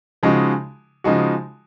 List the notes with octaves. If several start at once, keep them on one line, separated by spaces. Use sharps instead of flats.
C#3 F3 G#3 D#4 F#4
C#3 F3 G#3 D#4 F#4